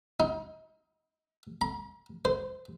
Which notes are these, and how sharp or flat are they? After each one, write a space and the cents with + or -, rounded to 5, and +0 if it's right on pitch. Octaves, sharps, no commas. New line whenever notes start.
D#4 +35
A#5 +45
C5 -25